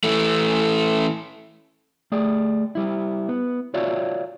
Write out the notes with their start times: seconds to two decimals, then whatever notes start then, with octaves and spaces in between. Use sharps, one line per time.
0.04 E3 A3
2.12 A3 G#4 D5
2.75 G3 E4
3.29 B3
3.74 F4 F#4 C#5 D5 E5 F5